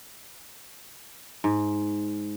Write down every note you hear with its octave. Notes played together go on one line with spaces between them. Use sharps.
G#2